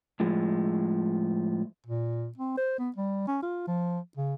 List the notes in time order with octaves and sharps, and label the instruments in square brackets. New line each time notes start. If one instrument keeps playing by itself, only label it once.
[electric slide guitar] A2 F3 G#3
[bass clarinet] A#2
C4
C5
B3
G3
C#4
F4
F3
C#3